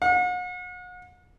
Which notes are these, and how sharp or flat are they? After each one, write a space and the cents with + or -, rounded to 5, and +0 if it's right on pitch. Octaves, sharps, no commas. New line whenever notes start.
F#5 -40